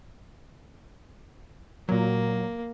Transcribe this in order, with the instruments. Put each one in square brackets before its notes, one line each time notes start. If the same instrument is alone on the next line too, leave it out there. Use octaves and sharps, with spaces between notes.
[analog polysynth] A#2 F#3 [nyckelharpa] A#3